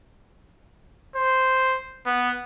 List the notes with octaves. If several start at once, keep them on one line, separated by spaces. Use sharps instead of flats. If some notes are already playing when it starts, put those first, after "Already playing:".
C5
B3